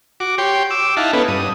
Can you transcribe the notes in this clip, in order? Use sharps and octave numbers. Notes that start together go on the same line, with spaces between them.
F#4 D6
G4 C#5 G5 C6
D6 E6
D#4 E4 F5 F#5 A5
B3 C#4 D#4 A4 B4
G2 D#6